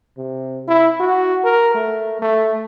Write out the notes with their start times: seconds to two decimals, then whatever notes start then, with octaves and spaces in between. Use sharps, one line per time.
0.17 C3
0.68 E4
1.00 F#4
1.44 A#4
1.75 A3
2.22 A3